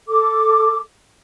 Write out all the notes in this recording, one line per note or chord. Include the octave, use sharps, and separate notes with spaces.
A4 D6